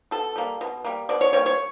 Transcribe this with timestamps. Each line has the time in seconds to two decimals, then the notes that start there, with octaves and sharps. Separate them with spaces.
0.11 B2 A4
0.36 G3 A#3
0.61 B2
0.85 G3 A#3
1.09 B2 D5
1.21 C#5
1.33 G3 A#3 C#5
1.46 C#5